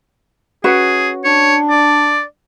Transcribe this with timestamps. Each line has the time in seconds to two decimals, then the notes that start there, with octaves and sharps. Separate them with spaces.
0.64 C#4 F#4 G#4 B4
1.24 D4 C#5
1.70 D5